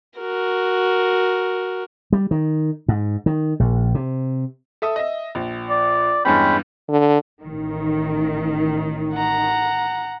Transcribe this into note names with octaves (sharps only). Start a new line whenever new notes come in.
F#4 A#4
G3
D#3
G#2
D#3
A#1
C3
A4 E5 D#6
D#5 E5
A#1
D5
E2 G2 G#3 C#4 G5 B5
D3
A1 D#3
F#5 A#5